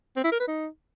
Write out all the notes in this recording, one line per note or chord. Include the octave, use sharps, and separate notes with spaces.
C4
E4
A#4
B4
D#4